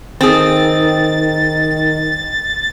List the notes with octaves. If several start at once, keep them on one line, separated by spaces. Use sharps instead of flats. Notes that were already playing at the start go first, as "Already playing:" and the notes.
D#3 C4 G#4 A6